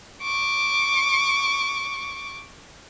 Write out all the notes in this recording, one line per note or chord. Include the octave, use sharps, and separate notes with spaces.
C#6 D6